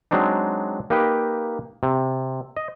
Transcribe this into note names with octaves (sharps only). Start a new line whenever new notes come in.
F#3 G#3 C4 D4 D#4
A#3 D#4 G4 B4 G5
C3
D#5